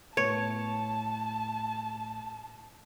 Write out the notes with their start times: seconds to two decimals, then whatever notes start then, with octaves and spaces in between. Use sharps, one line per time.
0.17 A2 B3 C#5 A5